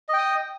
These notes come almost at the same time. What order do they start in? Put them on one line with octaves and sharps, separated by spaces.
D#5 G5 D#6